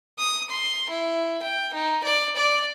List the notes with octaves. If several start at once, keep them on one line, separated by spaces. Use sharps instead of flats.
D#6
C6
E4
G5
D#4
D5
D5